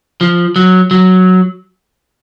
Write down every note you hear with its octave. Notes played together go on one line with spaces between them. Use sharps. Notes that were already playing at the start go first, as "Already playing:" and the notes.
F3
F#3
F#3